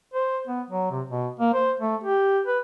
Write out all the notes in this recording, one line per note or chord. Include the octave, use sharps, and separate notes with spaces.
C5
B3
F#3
C3
B2
A#3
C5
A3
G4
B4